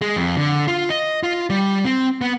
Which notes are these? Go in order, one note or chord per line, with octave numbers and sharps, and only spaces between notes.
G#3
F2
D3
F4
D#5
F4
G3
C4
B3